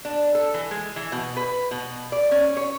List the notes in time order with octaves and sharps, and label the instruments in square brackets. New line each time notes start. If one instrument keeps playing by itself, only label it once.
[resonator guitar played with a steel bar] D4
A4
E3
G#3
E3
B2
B4
B2
D5
C#4
C#5